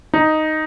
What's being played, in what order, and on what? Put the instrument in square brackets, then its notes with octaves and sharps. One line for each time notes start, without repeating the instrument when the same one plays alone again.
[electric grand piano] D#4